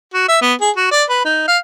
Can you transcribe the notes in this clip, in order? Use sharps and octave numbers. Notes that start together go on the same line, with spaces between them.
F#4
E5
B3
G#4
F#4
D5
B4
D#4
F5